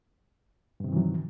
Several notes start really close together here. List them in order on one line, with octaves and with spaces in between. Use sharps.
G2 C3 D#3 E3 F#3